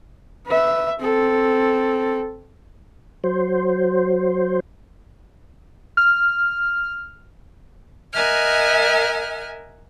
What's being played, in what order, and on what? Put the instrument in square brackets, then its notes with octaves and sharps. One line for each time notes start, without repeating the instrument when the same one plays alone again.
[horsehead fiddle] B4 E5
C4 A4
[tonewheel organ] F#3 C5
[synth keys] F6
[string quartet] A#4 D#5 E5 F#5 G#5 F6